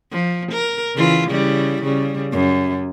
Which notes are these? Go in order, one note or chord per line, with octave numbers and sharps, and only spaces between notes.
F3
A#4
C#3 E3 F4
C#3 G3 E4
C#3 G3
F#2